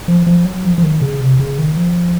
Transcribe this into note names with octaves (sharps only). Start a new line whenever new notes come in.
F3
F3
F#3
F3
F3
D#3
C#3
C3
C#3
D#3
F3